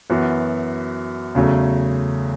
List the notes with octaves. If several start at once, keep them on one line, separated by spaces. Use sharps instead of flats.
F#2 E3 B3 F#4
E2 C#3 F#3 A3 C#4